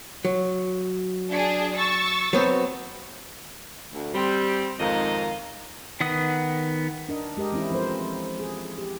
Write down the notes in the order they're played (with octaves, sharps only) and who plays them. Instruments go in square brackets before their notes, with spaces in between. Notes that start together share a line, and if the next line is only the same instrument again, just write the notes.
[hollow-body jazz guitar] F#3
[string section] D4 G#4
C#6 E6 A6
[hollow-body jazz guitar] F#3 B3 C4
[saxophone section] D2
G3 C4
F2 G#2 D#3 D#5 F5
[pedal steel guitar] D#3 B3 F#5 D#6
[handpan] D4 A#4 D#5
G#3 G4 A#4 D#5
E3 C4 C#4 E4
F3 C4 A4 A#4 C5
G#4
G4